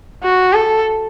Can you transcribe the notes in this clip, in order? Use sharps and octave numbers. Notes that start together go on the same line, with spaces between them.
F#4
A4